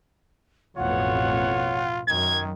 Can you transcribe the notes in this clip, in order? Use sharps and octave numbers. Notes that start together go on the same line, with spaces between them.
A1 F2 B2 F4 C#5 F#5
F#2 D#3 G#6